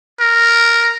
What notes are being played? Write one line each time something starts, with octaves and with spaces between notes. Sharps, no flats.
A#4